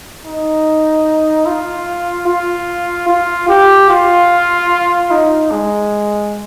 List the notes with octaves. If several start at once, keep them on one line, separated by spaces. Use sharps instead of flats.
D#4
F4
F4
F4
G4
F4
D#4
G#3